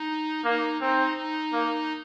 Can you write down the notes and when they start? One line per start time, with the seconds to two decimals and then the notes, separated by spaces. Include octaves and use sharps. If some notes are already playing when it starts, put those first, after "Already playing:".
Already playing: D#4
0.44 A#3 D#4
0.81 C4 D#4
1.17 D#4
1.53 A#3